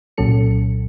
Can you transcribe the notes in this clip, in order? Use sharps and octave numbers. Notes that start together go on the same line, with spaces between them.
C2 A#2 F#3 C#4 A4 C#7